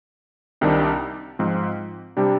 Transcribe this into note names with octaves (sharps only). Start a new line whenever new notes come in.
C2 C3 D#3 G3 D4
G#2 F3 C4
C3 G3 D4 G4